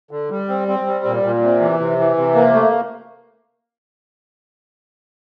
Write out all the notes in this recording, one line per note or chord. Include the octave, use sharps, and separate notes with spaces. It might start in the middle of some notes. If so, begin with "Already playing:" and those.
D3
G3
C4
C4
G3
A#2
A#2
C3
E3
C3
E3
C3
A#3
A3